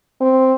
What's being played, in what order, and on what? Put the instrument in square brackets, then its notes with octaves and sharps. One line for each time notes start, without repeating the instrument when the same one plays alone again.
[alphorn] C4